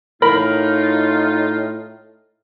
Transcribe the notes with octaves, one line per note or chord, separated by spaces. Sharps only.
A2 D#4 F4 A#4 B5